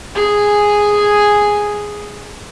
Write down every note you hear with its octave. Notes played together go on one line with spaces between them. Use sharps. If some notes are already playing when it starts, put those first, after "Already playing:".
G#4 G#5